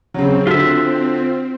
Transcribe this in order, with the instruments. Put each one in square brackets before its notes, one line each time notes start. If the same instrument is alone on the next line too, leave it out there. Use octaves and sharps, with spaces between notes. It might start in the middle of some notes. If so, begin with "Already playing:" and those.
[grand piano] C#3 F#3 [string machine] C4
[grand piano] D3 [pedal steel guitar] F4 E5 [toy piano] F#4